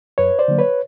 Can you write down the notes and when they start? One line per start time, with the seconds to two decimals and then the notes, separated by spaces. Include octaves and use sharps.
0.18 F#2 B4 C#5
0.39 C5 D5
0.48 D3 F#3 A#3
0.59 B4 C#5